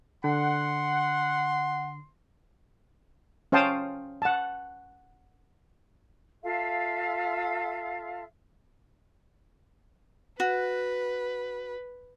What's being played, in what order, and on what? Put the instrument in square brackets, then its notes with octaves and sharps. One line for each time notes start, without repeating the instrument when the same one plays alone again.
[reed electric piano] D3 [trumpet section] F#5 [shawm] C6
[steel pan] C#4 C5 F5 G5 A5 D#6
F#5 A5
[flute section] F4 A4 E5 F5
[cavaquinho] F#4 [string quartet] B4